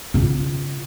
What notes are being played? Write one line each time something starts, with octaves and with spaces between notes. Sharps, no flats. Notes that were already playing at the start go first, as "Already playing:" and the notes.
C#3 F4